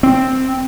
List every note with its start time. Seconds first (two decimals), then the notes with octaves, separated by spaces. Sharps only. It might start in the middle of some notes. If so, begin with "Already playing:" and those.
0.03 C4